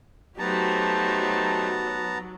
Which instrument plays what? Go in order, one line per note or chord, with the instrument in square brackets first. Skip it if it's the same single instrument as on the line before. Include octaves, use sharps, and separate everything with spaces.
[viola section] F#3 [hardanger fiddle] A3 D#4 [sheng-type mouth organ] B3 A5 A#5 [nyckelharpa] G4 C5